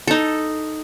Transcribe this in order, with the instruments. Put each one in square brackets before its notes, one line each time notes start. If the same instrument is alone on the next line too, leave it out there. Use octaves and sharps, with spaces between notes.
[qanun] D#4 A4